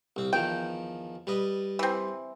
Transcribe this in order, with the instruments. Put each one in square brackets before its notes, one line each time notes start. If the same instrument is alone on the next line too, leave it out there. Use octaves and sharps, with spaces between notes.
[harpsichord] C2 C4
[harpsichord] E2 D#3 F3 [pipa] G5
[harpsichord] G3 B4 D#5
[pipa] E3 C4